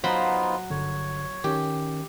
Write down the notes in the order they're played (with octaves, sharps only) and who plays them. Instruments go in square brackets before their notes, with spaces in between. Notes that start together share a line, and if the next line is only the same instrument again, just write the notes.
[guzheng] F#3 B5 C6 [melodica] B3 D#4 F4 [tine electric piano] C5 F5
[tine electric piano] G1 D3 [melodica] C#5
[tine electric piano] D#3 C#4 [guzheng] G4